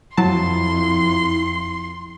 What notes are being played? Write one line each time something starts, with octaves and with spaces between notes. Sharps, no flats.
F2 F#3 E4 A5 C6